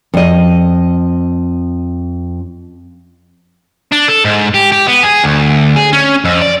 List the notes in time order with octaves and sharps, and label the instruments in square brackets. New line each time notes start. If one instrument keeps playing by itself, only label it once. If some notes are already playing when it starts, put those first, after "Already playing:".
[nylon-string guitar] F2 D#5
[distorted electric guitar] D4
A4
G#2
G4
G4
B3
G#4
D2
G#4
C#4
F2
D5